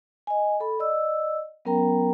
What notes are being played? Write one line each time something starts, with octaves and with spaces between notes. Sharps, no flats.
D#5 G#5
A4 B5
D5 D#5 E6
F#3 B3 C#4 A#4 G5 A#5